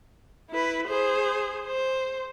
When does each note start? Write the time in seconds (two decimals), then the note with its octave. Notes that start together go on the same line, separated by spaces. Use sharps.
0.50 E4 B4
0.88 G#4 C5
1.66 C5